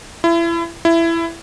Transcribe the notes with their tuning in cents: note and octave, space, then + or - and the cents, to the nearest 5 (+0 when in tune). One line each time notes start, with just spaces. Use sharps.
E4 +30
E4 +15